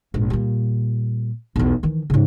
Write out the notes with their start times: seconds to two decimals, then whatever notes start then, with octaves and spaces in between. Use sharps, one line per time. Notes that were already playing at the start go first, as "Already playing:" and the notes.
0.14 A#1 G#2
0.30 A#2 G3
1.56 B1 E2
1.83 D#3 E3
2.10 G#2 C#3